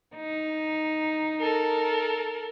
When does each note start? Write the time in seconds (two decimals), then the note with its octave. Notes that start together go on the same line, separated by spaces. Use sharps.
0.16 D#4
1.41 A4 A#4